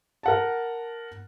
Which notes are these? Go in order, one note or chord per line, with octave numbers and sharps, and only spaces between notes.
A#4 F#5 A5